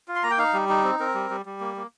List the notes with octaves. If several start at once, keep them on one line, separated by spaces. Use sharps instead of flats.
F4
C6
A#3 A#5
G5
D#4 F5
G3
D#4
C4
C4 A#4
G3
G3
G3
A#3
A#3